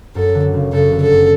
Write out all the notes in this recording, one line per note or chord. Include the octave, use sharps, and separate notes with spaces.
F#2 A4
D3
F#1
F#1 A4
D3
A4
F#2